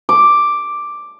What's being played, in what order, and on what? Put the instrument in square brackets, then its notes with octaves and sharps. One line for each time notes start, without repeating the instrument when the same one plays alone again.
[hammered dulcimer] D6